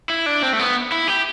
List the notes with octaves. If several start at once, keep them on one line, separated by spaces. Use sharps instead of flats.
E4
D4
C4
A3
B3
E4
G4